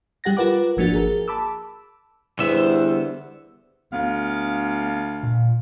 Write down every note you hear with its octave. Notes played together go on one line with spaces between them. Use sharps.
G3 G4 F#5 A6 A#6
F4 A#4 B4 F#5 D6
G#1 F3 A#3 D4 F#4 A6
G#4 A#4
A5 B5 D6 E6
E2 D3 G3 B3 C5 E5
D2 B3 F5
A#2